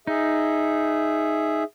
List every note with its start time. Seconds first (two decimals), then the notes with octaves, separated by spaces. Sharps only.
0.07 D#4 G#4 E5